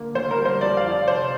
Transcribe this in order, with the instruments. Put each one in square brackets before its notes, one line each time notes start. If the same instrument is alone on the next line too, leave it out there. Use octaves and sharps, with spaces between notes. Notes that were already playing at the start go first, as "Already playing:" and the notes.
Already playing: [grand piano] D3 A#3
D2 C5
A#4
G3
C5
F2 D5
F5
F3
D5
F1 C5